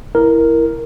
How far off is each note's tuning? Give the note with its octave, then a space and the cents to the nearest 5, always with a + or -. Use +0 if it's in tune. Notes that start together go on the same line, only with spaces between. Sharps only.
E4 +0 A#4 +0